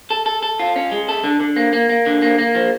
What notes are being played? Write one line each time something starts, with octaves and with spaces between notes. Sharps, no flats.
A4
A4
A4
F4
C#4
G#3
A4
D3
D3
A#3
A#3
A#3
D3
A#3
A#3
F3